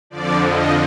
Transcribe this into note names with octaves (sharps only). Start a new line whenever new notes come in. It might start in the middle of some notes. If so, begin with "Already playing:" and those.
F2 D3 F3 D5
D#5